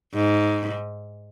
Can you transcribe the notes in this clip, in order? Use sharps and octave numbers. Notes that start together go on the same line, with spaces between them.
G#2